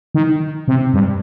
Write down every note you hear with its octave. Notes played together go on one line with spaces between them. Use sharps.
D#3
C3
G2